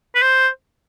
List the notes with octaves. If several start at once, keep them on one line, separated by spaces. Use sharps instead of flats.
B4
C5